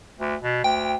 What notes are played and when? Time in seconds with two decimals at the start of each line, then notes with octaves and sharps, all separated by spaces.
0.19 D2
0.43 B2
0.64 D2 G5